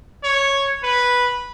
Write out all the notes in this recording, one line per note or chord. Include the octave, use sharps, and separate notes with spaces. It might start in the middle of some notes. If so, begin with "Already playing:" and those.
C#5
B4